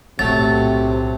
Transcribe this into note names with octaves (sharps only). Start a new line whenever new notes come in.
B1 A2 C3 F#3 A3 A6